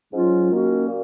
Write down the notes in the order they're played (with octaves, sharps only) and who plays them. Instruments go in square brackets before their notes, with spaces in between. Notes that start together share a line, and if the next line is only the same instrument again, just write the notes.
[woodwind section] G#2 F#3 C#4 F4
D#3 A#3 C#4 F#4
A#2